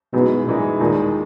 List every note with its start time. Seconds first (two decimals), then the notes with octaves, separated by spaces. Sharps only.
0.13 F#2 B2 E3 G#3 D#4 G#4
0.47 F#2 A#2 E3 G#3 D#4 G#4
0.80 D#2 A#2 D#3 G#3 D#4